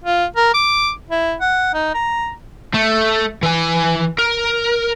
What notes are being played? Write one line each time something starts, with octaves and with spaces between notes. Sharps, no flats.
F4
A#4
D6
E4
F#5
D#4
A#5
A3
E3 G#5
A#4